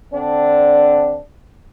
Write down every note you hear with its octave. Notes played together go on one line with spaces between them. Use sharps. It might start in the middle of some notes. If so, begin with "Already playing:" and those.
D3 C4 D4